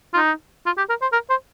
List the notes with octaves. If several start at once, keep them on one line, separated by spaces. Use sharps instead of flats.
F4
D#4
F4
G4
A#4
C5
A#4
C5